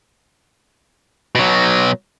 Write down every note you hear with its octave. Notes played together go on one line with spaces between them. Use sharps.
B2 F#3